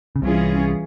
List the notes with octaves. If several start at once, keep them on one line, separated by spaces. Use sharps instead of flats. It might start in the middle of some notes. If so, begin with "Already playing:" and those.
C#3
C2 C3 E3 G3 C#4 F4 G#4